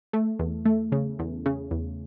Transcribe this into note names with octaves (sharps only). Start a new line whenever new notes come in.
A3
E2
A3
C#3
E2
C#3
E2